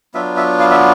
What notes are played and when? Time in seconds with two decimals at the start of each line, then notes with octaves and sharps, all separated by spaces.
0.14 F#3 B3 D4 F4 E5
0.37 E5
0.60 F5
0.71 E5